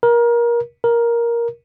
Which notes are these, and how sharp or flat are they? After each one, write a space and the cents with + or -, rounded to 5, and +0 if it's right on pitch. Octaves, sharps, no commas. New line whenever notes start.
A#4 +25
A#4 +10